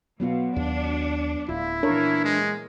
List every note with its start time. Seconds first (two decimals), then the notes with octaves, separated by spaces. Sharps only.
0.20 B2 F#3 B3 F4
0.56 D#2 D4
1.49 D1 E4 F4
1.83 A#2 E3 D4 A#4 C#5
2.24 G#3